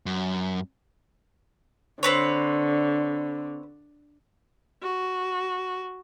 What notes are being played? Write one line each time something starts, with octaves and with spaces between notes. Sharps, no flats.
F#2
D3 C4 B4 C#5
F#4